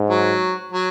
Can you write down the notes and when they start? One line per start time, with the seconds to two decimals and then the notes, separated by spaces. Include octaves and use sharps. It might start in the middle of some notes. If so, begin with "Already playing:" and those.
Already playing: G#2
0.10 F#3
0.72 F#3